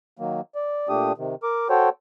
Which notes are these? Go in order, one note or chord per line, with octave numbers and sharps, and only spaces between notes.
D#3 F#3 A#3
D5
A#2 A3 D4 G4 D#6
C3 D#3
A#4 D6
F#4 A4 C5 C#5 G5